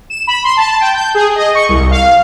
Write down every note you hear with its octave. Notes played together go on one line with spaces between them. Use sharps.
E7
B5
C6
A5
G5
G6
G#4
D#5
C#6
C2
F5